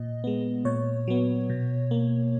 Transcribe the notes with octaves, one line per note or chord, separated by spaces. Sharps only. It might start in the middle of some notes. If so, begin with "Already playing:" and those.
Already playing: A#2 D#5
G#3 B3
A#2 C#5
F#3 B3
B2
A#3